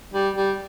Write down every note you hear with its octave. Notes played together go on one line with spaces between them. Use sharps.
G3
G3